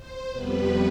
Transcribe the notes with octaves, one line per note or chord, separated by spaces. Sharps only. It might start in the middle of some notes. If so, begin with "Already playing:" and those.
Already playing: C5
F2 C3 G3 B3 B4